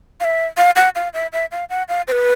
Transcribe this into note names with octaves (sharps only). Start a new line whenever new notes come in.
F5
E5
F5
F#5
F5
E5
E5
F5
F#5
F5
C5
B4